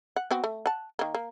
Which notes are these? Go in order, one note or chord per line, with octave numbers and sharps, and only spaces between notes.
F#5
B3 C4 F#4
A3
F#5 A5
D#3 A#3
A#3